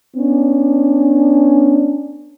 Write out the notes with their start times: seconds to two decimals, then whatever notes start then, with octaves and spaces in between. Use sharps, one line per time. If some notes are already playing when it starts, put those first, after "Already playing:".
0.16 B3 C#4 D4